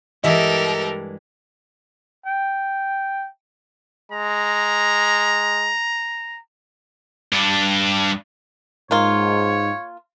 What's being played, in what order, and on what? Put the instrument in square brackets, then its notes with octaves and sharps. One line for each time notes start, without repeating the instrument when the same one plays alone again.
[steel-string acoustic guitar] G2 E3 G#3 [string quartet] G4 A4 A#4 [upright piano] D#5 E5
[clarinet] G5
[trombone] G#3 [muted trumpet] A#5
[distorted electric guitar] G2 D4
[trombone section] G#2 [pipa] A#3 F4 [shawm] C#5